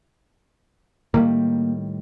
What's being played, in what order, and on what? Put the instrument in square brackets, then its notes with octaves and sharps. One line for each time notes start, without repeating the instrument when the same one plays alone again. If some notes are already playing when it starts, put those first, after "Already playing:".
[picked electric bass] A2 D#3 G3 [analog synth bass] A#3